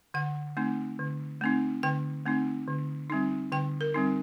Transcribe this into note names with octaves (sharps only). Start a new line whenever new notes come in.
D3 F#5
A3 C4 D#4
D3
A3 C4 D#4
D3 G5
A3 C4 D#4
D3
G3 C4 D#4
D3 G5
A#4
G3 C4 D#4